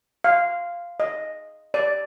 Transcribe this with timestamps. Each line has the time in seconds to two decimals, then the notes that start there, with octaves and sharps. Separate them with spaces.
0.24 F5
1.00 D#5
1.74 D5